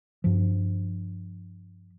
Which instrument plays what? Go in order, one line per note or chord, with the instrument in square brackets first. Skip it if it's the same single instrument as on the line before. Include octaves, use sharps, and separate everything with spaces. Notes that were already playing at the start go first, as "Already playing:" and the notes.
[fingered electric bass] G2 F3